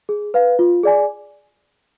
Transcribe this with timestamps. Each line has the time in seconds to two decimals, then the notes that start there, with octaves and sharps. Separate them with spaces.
0.09 G#4
0.34 B4 F5
0.59 F4
0.83 G#4 D5 G#5